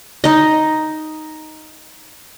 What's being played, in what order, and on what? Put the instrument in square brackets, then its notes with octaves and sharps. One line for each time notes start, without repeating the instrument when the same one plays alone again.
[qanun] D#4 D#5